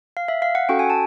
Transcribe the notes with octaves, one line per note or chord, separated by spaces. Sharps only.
F5
E5
F5
F#5
C#4 F#4 A4 G5
G#5
A5